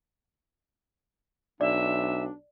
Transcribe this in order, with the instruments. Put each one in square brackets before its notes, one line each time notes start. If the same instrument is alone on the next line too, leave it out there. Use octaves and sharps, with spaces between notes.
[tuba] B1 [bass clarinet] D4 [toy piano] D5 [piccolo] E5